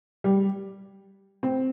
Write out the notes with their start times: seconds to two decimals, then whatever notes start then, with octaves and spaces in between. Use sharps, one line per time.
0.24 G3
1.43 C4